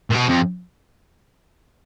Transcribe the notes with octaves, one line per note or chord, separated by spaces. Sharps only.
A#2
B2
F2